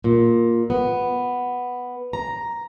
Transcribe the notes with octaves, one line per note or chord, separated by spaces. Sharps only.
A#2
B3
A#5